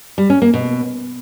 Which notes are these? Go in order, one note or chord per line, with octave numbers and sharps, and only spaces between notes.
G3
C#4
A#3
B2